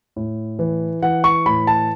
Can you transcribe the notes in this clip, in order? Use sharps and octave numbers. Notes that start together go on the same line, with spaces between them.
A2
E3
E3 F#5
C#6
A2 B5
A5